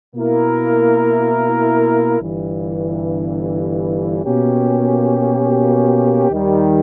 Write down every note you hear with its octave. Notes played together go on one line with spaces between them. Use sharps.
B2 A#3 E4 A#4
G1 G2 E3
B2 A#3 C#4 G4
D#2 D#3 G3